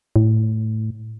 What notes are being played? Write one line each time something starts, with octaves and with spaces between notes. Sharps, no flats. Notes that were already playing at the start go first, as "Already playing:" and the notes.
A2